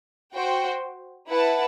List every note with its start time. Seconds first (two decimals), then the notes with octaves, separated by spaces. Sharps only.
0.35 F#4 C5 G5
1.29 E4 B4 F#5 A5